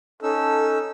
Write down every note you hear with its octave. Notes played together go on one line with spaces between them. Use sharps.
C#4 D#4 A4 E6